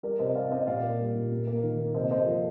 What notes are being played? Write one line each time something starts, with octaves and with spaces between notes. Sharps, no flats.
G3 A#4 D5
C3 C5 D#5
C3 D5 F5
C4 C5 D#5
A#2 D5 F5
A#3
G3
A#2
A#3
A#3
D#3
A#3
C3 C5 D#5
A#3 C5 D#5
F3 F4 A4